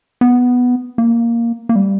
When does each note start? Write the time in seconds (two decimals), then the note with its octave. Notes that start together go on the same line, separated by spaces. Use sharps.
0.21 B3
0.98 A#3
1.69 A#3
1.76 G3